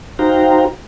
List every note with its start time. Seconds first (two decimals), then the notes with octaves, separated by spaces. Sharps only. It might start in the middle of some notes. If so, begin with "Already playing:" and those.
0.19 D#4 F#4 C5 F5 G5 A#5